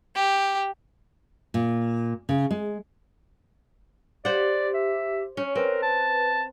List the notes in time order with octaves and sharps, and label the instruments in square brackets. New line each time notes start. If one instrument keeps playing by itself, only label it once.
[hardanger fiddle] G4
[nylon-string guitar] A#2
C#3
G#3
[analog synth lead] G4 [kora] C5 F#5 [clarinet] D5
[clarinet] E5
[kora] C#4 [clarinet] C#5
[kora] C4 [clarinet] A#4 [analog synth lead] B4
[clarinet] A5